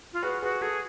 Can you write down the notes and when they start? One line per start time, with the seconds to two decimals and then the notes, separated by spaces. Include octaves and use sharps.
0.13 F4
0.23 F#4 G#4 B4
0.42 F#4 G#4 B4
0.61 F#4 G#4 A4